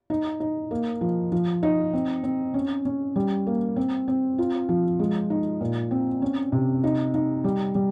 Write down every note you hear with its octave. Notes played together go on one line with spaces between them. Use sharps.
D#4
D#4
A#3
F3
F3
D#4
C4
C4
C#4
C#4
G3
A#3
C4
C4
F4
F3
G#3
D#4
A#2
C4
C#4
C3
D#4
D#4
G3
G3